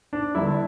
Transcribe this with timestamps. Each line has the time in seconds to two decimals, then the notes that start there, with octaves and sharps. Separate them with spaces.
0.13 D4
0.35 G1 G2 D3 E4